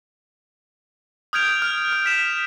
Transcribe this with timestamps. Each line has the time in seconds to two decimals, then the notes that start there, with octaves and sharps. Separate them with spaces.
1.33 D#6 F6 G6 G#6 D7 F7
1.62 F6
1.93 F6
2.06 B6 E7